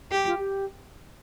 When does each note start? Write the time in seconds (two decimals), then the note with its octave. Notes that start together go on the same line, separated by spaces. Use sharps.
0.11 G4
0.26 F4
0.38 G4